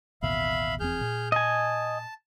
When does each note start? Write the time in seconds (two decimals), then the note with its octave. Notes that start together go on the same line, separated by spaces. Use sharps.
0.22 A1 D#2 B2 E5 F5 B5
0.80 F1 E2 C4 G#4 F6 G6
1.01 A#2
1.32 D#5 G#5 A5